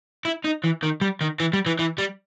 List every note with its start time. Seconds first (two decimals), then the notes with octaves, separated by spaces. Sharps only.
0.25 E4
0.44 D#4
0.64 E3
0.83 D#3
1.01 G3
1.21 D#3
1.40 E3
1.53 G3
1.66 E3
1.79 E3
1.98 G3